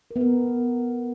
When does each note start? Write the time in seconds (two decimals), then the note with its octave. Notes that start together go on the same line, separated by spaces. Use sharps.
0.11 A#4
0.16 B3
0.21 A#4